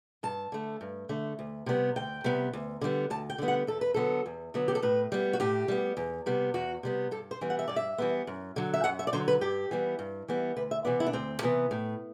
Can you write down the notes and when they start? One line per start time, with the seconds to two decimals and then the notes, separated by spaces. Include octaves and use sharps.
0.23 G2 A5
0.52 D3 A3
0.81 G2
1.09 D3 A3
1.39 D2
1.66 C3 G3 B3
1.96 D2 G5
2.24 C3 G3 B3
2.53 D2
2.81 D3 G3 B3
3.10 D2 A5
3.30 G5
3.38 D3 G3 B3
3.48 F#5
3.67 E2 A4
3.81 B4
3.94 D3 F#3 B3 A4
4.26 E2
4.54 D3 F#3 B3
4.68 G4
4.75 A4
4.82 A2 B4
5.12 G3 B3
5.33 F#4
5.40 A2 G4
5.68 G3 B3
5.97 E2
6.26 C3 G3 B3
6.54 E2 F#4
6.83 C3 G3 B3
7.11 G2 A4
7.31 C5
7.41 E3 G3 B3
7.50 F#5
7.59 E5
7.68 G2 D5
7.76 E5
7.98 E3 G3 B3
8.27 F#2
8.56 D3 F#3
8.74 E5
8.84 F#2 F#5
8.99 E5
9.07 D5
9.13 D3 F#3 C5
9.28 B4
9.41 G2 G4
9.71 E3 G3 B3
9.99 G2
10.28 E3 G3 B3
10.56 D2 B4
10.71 E5
10.85 C3 E3 B3 D5
11.00 E4
11.07 D4
11.13 D2 C4
11.43 C3 E3 B3
11.71 A2